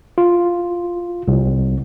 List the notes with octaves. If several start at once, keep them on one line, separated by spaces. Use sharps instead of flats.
F4
C2